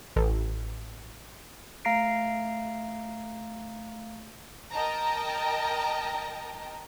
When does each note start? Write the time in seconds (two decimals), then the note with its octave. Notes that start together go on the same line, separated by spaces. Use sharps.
0.16 A1
1.85 A3 F5 A#5 A#6 C7 D7
4.71 A#4 D#5 G5 A5 A#5